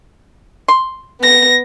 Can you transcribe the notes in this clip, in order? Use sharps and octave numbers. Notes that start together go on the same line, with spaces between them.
C6
B3 A#6